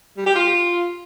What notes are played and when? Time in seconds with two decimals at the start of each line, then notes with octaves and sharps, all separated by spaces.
0.17 G3
0.26 G4
0.35 F4